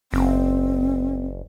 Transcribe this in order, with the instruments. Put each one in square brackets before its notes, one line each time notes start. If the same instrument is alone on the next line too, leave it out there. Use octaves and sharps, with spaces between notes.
[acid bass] F#1 [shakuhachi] C4